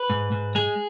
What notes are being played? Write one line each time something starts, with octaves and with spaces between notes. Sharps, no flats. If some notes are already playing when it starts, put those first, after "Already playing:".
Already playing: B4
G#2
G#2
G#3 G#4